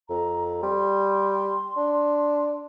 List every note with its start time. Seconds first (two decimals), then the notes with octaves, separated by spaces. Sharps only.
0.09 F2 A#5
0.63 G3 C6
1.77 D4